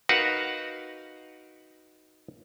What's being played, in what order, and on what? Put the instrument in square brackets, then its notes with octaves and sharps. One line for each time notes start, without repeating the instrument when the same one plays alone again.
[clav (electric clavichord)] D#4 F#4 A#4 B4 F5 F#5